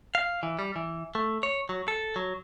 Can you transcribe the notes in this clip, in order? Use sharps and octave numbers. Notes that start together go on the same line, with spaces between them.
F5
E3
G3
E3
A3
C#5
F#3
A4
F#3